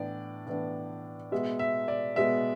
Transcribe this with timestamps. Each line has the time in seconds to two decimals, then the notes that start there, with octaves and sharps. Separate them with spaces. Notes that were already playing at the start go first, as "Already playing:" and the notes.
Already playing: A2 E3 B3 D4 D5
0.47 A2 E3 B3 D4
1.31 B2 G#3 B3 E5
1.59 E5
1.88 D5
2.16 B2 G#3 B3 E5